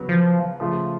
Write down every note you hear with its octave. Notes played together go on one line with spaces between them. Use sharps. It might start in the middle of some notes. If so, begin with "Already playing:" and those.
Already playing: C#3 F#3 B3
F3
C#3 F3 A3 F4